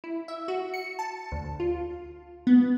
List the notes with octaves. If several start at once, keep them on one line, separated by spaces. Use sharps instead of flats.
E4
E5
F#4
C#7
A5
D2
F4
B3